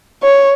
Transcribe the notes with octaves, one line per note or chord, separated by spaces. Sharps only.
C#5